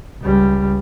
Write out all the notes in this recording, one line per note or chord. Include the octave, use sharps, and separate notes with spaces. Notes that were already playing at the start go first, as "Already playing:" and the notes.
C#2 G3